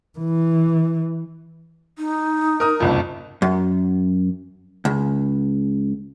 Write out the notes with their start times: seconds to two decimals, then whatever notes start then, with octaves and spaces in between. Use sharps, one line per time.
0.19 E3
1.97 D#4
2.60 A#4 D#6
2.80 F#1 C2 F2
3.42 F#2
4.85 C#2